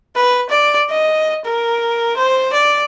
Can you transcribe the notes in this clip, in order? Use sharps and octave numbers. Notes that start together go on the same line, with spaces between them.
B4
D5
D#5
A#4
C5
D5